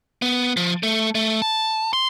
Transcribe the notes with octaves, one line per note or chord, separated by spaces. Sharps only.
B3
F3
A3
A3
A5
C6